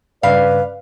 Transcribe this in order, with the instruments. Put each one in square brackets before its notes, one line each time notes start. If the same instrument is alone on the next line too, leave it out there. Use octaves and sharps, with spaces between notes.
[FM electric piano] G2 C#3 B5 [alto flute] B4 [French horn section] D5 [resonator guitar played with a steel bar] F5